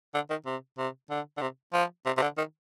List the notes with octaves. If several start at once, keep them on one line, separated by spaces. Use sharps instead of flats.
D3
D#3
C3
C3
D3
D3
C3
F3
C3
C3
D3
D#3